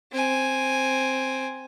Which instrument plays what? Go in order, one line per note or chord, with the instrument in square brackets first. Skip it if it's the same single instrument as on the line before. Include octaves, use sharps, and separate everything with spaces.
[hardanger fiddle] C4 G#5